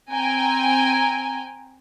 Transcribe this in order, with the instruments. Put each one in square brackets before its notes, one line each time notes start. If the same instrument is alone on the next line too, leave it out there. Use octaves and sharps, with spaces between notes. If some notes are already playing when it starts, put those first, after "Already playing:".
[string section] C4 G5 G#5 A#5